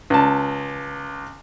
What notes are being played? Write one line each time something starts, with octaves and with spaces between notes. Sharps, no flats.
C#2 A5